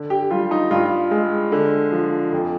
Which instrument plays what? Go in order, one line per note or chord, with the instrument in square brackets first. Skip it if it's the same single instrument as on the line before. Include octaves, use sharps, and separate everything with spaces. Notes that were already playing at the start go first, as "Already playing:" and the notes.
Already playing: [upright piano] D3
G4
G3 F4
D#4
G2 F4
G#3
D3
F3
F2